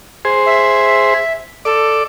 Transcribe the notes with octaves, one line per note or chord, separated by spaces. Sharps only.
G#4 C5
E5
A4 D5